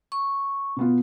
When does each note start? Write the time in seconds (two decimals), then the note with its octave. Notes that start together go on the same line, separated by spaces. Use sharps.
0.12 C#6
0.77 B2 B3 F4